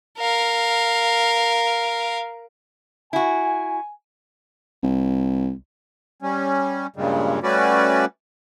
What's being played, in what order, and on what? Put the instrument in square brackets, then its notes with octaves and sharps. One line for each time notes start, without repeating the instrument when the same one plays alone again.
[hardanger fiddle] A#4 F5
[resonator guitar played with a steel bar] E4 F#4 [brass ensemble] G#5
[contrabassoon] C2
[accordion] G3 C#4
G2 A#2 C#3 G3 G#3
G3 A3 C#4 F#4 B4 D5